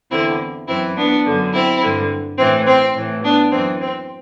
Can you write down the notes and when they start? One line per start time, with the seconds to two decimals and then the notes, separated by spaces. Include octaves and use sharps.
0.10 E2 D3 C4 E4
0.67 F#2 E3 C4 E4
0.96 B3 D4
1.25 F#2 D3
1.53 C4 E4
1.82 G2 D3
2.37 A2 E3 C4
2.66 C4
2.94 A2 E3
3.23 B3 D4
3.51 F#2 E3 C4
3.80 C4